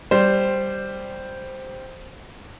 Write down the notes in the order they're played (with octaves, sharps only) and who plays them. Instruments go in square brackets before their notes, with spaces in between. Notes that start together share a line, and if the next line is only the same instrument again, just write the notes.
[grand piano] G3 C5